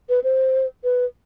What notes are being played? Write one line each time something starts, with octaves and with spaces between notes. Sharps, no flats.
B4
C5
B4